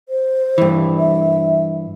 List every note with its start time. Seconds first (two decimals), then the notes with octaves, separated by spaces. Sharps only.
0.09 C5
0.58 G2 E3
0.98 E5